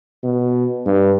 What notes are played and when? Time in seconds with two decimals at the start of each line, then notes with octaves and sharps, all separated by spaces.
0.23 B2
0.86 G2